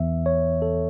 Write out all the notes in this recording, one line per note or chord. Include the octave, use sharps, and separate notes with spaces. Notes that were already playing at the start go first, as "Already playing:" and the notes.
Already playing: E2 E3 B3 E5
C#5
A4